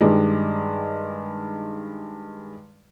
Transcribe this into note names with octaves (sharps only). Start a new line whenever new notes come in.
G2 D#3 G3 G#3